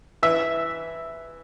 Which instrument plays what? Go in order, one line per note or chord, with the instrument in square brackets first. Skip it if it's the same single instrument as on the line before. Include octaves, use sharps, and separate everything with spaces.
[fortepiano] E3 E5